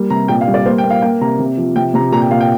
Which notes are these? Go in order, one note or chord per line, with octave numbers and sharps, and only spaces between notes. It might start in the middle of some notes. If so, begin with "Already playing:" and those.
Already playing: G3 A#3
C3 A#5
A#2 G5
F5
G3
D5
A#3 C5
G5
A#3
F5
A#3 G5
C3 A#5
C3
F3
C3 G5
C3 A#5
A#2 A#5
G5
A#2 F5
G5